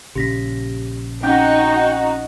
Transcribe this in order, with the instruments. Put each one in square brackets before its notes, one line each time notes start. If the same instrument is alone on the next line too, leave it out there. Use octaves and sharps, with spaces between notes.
[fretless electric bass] A#1 C#3 [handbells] G4 A#6 B6
[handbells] C4 C#4 F#5 [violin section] D#4 F#4 [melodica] G5